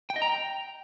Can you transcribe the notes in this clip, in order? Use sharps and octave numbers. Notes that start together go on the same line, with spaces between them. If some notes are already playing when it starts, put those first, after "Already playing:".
G5
D#5
A#5
G5